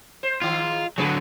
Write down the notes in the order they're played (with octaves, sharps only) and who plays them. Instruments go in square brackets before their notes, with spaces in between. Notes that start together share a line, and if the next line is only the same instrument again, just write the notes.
[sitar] C5
[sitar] G#2 D#3 [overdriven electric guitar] F4
[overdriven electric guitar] D3 F#3 [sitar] G#4 B4